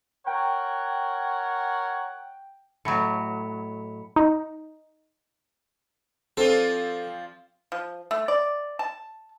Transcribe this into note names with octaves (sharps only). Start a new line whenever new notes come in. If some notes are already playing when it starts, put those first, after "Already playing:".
A#4 C#5 F#5 G5
A2 F#3 A3 B5 C#7
D#4
F3 C4 F4 A4 D5
F3
A3
D5
A5